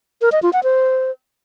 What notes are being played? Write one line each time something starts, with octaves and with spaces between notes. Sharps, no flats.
A#4
D#5
F4
F#5
C5